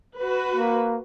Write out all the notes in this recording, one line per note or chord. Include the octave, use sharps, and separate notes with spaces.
F#4 B4
A#3